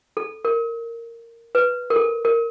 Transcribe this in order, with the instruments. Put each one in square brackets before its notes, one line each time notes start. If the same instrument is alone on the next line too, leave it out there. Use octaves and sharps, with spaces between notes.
[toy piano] A4
A#4
B4
A#4
A4
A#4